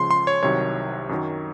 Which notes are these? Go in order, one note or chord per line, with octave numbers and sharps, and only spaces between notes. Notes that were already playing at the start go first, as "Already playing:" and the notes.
Already playing: C#2 C#3 F3 C6
C6
C#5
C2 C3 D#3 F#3 C#5
F#2 D#3 F#3